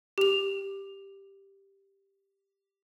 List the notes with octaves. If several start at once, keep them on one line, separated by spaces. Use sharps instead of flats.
G4 F7